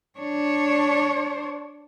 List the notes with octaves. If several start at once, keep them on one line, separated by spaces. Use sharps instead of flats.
D4 C#5